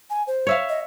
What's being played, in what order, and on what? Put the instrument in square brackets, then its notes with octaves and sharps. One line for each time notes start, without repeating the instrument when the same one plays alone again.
[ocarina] G#5
C5
[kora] C#5 E5 F5
[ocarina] D#5